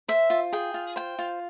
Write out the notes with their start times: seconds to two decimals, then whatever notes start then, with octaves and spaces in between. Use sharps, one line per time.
0.08 C5 E5
0.30 F4
0.52 G#4 G5
0.74 F4
0.96 C5 G5
1.19 F4